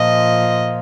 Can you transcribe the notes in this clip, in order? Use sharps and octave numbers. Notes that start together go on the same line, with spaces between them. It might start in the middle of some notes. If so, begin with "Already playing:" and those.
Already playing: A#2 F3 D#5